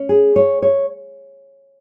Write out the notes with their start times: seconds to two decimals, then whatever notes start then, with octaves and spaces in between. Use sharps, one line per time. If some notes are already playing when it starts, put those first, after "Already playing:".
Already playing: C#4
0.09 G#4
0.36 C#5
0.62 C#5